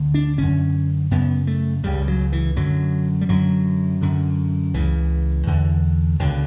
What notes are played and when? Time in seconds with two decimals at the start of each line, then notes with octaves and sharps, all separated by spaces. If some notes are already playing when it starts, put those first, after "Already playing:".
Already playing: D2 D3
0.14 D4
0.38 F#2 D3 C#4
1.11 F#2 C#3 B3
1.47 A3
1.83 C#2 C#3 G3
2.08 F#3
2.32 E3
2.56 F#2 D3 F#3
3.21 G3
3.29 F#2 D3 F#3
4.01 F#2 D3
4.74 C#2 C#3 E3
5.47 E2 D3
6.19 C#2 B2 D3